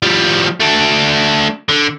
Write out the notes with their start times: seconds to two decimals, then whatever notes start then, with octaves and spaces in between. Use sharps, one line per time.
0.03 F3 G3
0.60 A3 D4
1.69 D3